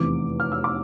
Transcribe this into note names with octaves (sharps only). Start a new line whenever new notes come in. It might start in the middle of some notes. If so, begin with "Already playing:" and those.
Already playing: F1 E2 C3 E3 D6
F6
E6
D6